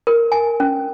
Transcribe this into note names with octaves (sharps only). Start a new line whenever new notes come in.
A#4
G#5
C#4